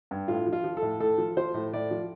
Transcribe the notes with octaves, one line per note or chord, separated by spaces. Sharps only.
G2
A2 F4
F3
F4
F3
A4
A2
A2 A4
F3
F3 C5
A2
A2 D5
F3